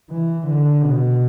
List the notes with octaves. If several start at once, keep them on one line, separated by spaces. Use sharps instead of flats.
E3
D3
B2